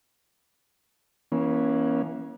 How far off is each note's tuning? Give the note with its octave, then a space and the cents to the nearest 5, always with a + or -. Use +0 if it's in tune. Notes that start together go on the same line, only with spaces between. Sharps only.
E3 +0 A#3 +40 C#4 +0